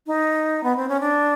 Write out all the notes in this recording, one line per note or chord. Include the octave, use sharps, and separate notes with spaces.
D#4
B3
C4
C#4
D4